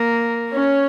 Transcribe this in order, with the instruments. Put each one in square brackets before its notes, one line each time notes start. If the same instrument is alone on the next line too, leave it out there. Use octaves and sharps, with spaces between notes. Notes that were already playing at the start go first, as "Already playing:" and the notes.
Already playing: [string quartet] A#3 A#4
C#4 C#5